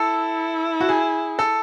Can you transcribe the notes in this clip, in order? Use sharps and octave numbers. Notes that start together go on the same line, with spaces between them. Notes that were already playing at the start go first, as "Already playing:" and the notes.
Already playing: E4 A4
F#4
G#4
A4